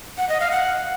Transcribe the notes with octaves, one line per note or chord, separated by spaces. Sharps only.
F#5
D#5
F5
F#5